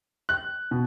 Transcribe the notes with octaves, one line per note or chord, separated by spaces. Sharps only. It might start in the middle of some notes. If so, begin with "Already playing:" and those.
F#6
B2